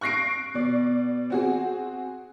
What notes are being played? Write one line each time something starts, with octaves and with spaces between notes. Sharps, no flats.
C#6 F#6 A#6 C7 D7
B2 D5
C4 F#4 G#4